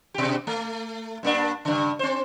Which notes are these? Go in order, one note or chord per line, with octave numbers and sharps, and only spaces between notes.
B2 G4
A3
G2 A#3 D4
G2 C#3
C4 C5